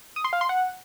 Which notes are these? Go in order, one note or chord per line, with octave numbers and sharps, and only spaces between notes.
D#6
C6
F5
C6
F#5